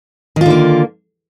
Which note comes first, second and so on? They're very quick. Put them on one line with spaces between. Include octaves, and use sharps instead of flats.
D#3 F4 D3 A#3